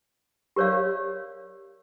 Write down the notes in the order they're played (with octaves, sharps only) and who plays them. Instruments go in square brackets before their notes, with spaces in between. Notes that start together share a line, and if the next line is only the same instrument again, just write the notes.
[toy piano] G4 A#4 C#5 D5 F5